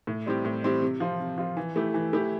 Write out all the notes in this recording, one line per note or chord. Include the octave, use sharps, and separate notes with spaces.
A2
G3 C4 E4 G4
A2
G3 C4 E4 G4
C3
F3 C4 F4
C3
F3 C4 F4
E3
A3 E4 G4
E3
A3 E4 G4